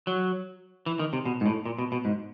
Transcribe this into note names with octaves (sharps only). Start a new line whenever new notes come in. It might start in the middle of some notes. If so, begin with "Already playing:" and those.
F#3
E3
D#3
C3
B2
G#2
A2
A#2
B2
B2
G#2